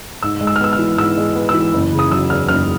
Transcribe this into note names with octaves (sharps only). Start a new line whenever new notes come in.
G#2 E6
G#3
E6
F6
B3 E6
F6
E3
G#2 E6
G#3
B3
E6
E3
F#1
C#3
D#6
F#3 E6
E2 F6
F#1 F6